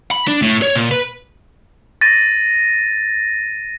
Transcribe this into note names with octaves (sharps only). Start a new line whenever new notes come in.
B5
D4
A2
C#5
A#2
B4
A6 A#6 D#7